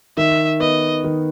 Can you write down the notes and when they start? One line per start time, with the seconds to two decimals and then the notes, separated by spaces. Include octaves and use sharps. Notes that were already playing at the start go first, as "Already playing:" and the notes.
0.17 D#3 E5
0.60 B3 D#5
1.04 D#3